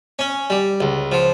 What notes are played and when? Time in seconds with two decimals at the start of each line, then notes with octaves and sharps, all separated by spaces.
0.19 C#4
0.50 G3
0.81 C#2
1.12 F3